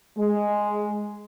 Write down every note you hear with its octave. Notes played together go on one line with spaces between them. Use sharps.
G#3